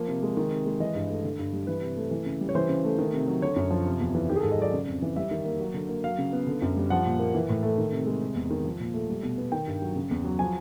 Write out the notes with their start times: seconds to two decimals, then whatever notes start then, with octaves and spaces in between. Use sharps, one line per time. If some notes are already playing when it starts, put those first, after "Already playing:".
Already playing: F3 A#3
0.08 C3
0.23 G#3
0.37 D#3
0.51 C3
0.66 G#3
0.80 E3 D#5
0.95 G2
1.10 A3
1.24 D3
1.39 G2
1.53 G3
1.67 E3 B4
1.82 C3
1.97 A3
2.11 E3
2.26 C#3
2.41 G3
2.49 C#5
2.55 E3 C5
2.69 C#3
2.84 A3
2.99 D#3
3.13 C3
3.27 F#3
3.42 D3 C#5
3.56 F#2
3.71 F3
3.86 C3
4.00 E2
4.15 E3
4.29 D#3 G4
4.36 G#4
4.40 A4
4.43 G#2
4.52 D#5
4.58 F#3 D5
4.73 C#3
4.87 F2
5.02 E3
5.16 G3 E5
5.31 D#3
5.45 A#3
5.60 F#3
5.74 D3
5.89 A#3
6.04 F#3 F5
6.18 C#3
6.33 B3
6.47 D3
6.62 F#2
6.77 G3
6.90 F3 F#5
7.06 A#2
7.19 A#3
7.35 E3
7.49 A2
7.63 A3
7.78 D#3
7.92 C3
8.06 G#3
8.22 C3
8.36 E2
8.50 D#3
8.65 F3
8.80 A#2
8.94 A3
9.09 G3
9.23 B2
9.38 B3
9.52 D#3 G5
9.67 G2
9.82 F#3
9.96 C#3
10.11 E2
10.25 F#3
10.39 F3 G#5